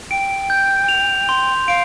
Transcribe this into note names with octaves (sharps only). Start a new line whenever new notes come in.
G5 D7
G6
F7
C6
F5 D7